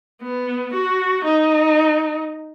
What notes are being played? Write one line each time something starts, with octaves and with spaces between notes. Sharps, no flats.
B3
F#4
D#4